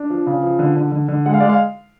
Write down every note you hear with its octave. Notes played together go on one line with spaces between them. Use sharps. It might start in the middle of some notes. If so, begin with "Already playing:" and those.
Already playing: D4
F3
C#3
F3
D3
D3
D3
D3
G#3 F#5
F5
G#3 D5
F5